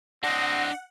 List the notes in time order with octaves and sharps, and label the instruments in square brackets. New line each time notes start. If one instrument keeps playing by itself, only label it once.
[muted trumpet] C4 [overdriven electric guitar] D4 D#5 [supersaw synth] F#5 [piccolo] A#6